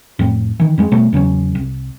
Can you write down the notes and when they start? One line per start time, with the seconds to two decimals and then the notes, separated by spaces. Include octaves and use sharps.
0.19 F2 A2
0.60 D#3 E3
0.78 F2 G3 G#3
0.92 B2 G3 A3
1.13 E2 C#3 F#3 C#4
1.55 C2